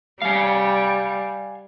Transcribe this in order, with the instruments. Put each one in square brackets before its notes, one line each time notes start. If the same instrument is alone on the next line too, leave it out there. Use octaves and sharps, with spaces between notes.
[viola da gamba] G3 [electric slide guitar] F5 G#5